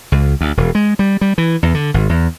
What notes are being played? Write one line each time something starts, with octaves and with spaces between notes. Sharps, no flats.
C#2
D2
E1
G#3
G3
G3
E3
E2
D3
G#1
E2